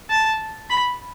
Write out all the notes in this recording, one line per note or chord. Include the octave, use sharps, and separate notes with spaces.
A5
B5